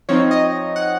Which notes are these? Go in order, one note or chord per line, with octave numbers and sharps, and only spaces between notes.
F3 C4 D#4 C#5
D#5
F#5